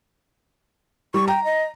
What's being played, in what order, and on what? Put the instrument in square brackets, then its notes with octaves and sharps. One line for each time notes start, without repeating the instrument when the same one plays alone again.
[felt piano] G3 [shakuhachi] C#6
[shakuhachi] G5 [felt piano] A#5
[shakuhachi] D#5